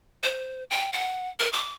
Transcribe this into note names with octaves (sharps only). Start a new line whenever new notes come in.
C5
G5
F#5
A#4
D6